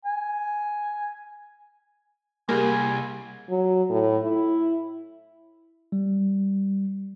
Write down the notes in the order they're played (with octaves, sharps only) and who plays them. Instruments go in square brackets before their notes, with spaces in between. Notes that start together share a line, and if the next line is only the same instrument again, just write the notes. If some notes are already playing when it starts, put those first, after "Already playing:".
[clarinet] G#5
[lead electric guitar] C2 [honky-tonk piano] G3 G4 G#4 [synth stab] A#3 [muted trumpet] G#5
[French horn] F#3
A2
E4
[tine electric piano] G3